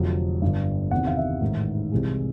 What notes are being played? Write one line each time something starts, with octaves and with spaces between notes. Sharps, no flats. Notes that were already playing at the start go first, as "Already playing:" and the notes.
Already playing: F1 F2 D3 F#3
G1 G2 D3
E2 C3 D#3 F#5
F5
E5
A1 G#2 D#3
C2 C3 E3 G#3